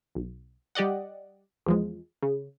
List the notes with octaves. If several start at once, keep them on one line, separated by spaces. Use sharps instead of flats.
B1
G3 G4 D5 D#5 F#5
E2 F3 G#3
C#3